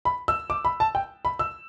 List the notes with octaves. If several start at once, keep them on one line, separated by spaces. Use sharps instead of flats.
B5
E6
D6
B5
A5
G5
B5
E6